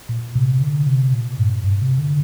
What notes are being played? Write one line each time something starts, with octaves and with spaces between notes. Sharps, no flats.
A#2
C3
D3
C3
A#2
G2
G2
C3
D3